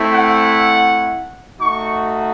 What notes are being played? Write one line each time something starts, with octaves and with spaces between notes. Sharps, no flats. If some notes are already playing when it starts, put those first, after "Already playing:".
Already playing: A3 C4 E4
F#5
A3 D#4 F#4 C#6